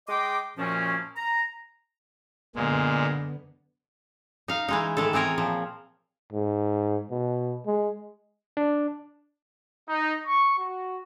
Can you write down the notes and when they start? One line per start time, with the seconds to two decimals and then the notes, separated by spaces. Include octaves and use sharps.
0.08 G#3 D#5 G5 C6 D6
0.58 F#2 A#2 F3 A#3 C#4
1.16 A#5
2.56 F#2 A#2 D3 G#3 B3
4.48 D#4 F5 A#5
4.68 E3 G#3 D#4
4.97 A2 D#3 G#3 A4
5.13 E3 C4 G#4 A#4 C#5
5.38 A#2 F3
6.33 G#2
7.11 B2
7.66 G#3
8.57 D4
9.89 D#4
10.26 C#6
10.59 F#4